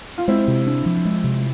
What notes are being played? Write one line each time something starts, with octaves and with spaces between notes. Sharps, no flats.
F4
G#3 C4 E4
C3
D4
F3
G#3
C3